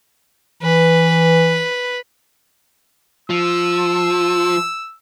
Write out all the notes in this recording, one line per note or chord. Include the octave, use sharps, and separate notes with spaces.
E3 B4
F3 E6